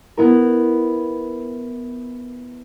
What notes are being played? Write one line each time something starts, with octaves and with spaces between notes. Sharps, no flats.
B3 E4 A#4